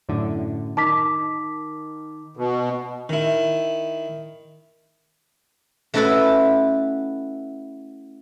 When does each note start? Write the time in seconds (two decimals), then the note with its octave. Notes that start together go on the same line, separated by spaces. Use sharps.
0.09 F#2 A2 D3
0.77 D#3 A5 D6 B6
2.37 B2
3.09 D#3 E4
5.94 A3 C#4 E4 F#4 A4 B4